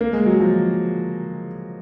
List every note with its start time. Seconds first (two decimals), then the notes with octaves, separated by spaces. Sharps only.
0.01 A#3
0.13 G#3
0.26 F#3
0.40 F3